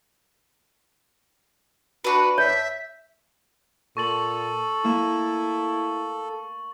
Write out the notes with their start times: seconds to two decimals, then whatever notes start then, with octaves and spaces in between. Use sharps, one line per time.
2.04 D4 F#4 B4
2.38 C#5 E5
3.97 A#2 A4 C#6 A6 F#7
4.84 A#3 E4